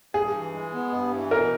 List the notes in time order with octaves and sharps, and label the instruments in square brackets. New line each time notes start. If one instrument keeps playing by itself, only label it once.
[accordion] G2 [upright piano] G#4
[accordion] E3
G#3
B3
G2
E3
[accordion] B2 [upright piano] A#4